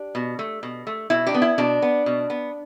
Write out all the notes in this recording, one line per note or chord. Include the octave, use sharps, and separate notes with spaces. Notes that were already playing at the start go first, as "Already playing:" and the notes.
Already playing: D4 G4
B2
A3
B2
A3
B2 E4
D4 G4
B3
E4
B2 D4
B3
B2
B3